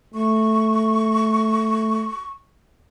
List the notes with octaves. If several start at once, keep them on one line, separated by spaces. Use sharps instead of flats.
A3 C#6